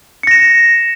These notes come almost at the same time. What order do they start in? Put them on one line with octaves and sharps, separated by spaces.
C#7 A#6 E7